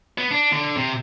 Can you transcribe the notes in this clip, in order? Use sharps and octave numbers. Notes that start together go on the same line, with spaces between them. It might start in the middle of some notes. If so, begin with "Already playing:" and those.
B3
D4
D3
C3